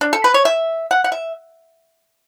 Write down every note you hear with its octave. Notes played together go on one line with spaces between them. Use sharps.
D4
A4
B4
C#5
E5
F#5
F#5
E5